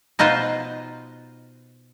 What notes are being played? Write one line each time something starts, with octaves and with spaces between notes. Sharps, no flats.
B2 D#4 F4 B4 C5